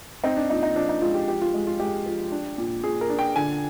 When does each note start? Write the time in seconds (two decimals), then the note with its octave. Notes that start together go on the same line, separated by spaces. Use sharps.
0.24 C4 D#4
0.37 D4
0.50 A#2 D#4
0.63 D#4
0.76 F3 D4
0.89 D#4
1.02 G#3 F4
1.14 G4
1.28 F3 G4
1.41 F4
1.54 G#3
1.67 F4
1.79 G#3 G4
2.06 F3
2.32 D4
2.58 A#2
2.84 A#2 G#4
3.01 A#4
3.09 D4
3.19 G5
3.36 D3 G#5